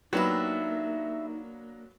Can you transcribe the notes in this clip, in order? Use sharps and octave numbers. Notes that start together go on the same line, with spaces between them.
F#3 A#3 B3 D4 D#4 G4 B4 E5